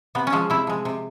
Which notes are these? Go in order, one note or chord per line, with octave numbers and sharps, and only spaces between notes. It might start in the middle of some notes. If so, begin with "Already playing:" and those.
C3 B3
C#4
F3 G#3
C3 E4
F3 G#3
C3